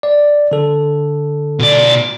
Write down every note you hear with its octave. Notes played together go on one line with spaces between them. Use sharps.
D5
D3 A4
B2 D5